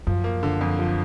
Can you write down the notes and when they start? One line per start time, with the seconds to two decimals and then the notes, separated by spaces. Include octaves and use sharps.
0.07 F#2 F3
0.24 A#3
0.43 D3
0.61 F2
0.79 F3